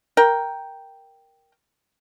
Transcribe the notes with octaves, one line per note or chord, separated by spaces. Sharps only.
A#4 G5